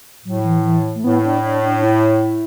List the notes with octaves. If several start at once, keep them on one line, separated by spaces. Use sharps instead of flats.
A2 F#3
E3
E3
A3
A2 B3
D4
D4
D4
D4
E4